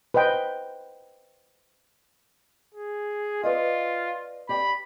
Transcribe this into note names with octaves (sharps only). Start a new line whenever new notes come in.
B4 C5 D#5 G5
G#4
F4 B4 D5 D#5
G4 D5 B5